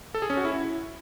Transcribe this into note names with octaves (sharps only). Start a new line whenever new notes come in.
A4
G#4
C#4
F#4
E4